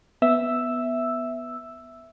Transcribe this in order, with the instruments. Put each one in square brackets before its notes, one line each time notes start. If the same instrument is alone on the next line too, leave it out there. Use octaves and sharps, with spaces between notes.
[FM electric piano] B3 E5 E6